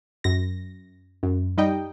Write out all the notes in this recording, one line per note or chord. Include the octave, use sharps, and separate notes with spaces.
F#2 A#6
F#2
G3 D#4 D#5 G5